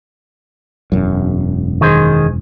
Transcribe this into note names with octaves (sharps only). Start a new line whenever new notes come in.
E1 F#2
D#3 G#4 C5